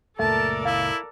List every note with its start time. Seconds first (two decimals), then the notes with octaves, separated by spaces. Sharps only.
0.19 F#1 C#2 A#2 A3 A4 A#4 D5 A5
0.65 E4 F5